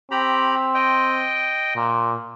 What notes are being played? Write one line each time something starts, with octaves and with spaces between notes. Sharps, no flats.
C4 G4 A#5 B5
D#5 G5
A#2